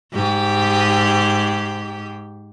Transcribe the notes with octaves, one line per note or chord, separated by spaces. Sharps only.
G#2 G4